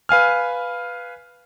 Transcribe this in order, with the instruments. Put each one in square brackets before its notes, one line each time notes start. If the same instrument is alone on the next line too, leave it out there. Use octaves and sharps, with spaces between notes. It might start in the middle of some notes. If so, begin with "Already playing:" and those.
[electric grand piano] B4 F5 G#5 F6